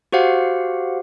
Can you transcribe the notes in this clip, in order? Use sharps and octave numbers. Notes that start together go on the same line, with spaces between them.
F#4 G4 C5 F5 F#5